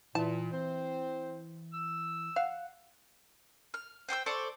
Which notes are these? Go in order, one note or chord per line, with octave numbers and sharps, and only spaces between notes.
A#2 E3 E4 A5
C4 C5
E6
F5 F#5
F6
C5 G5 C#6 E6
A4 C5 D5 C#6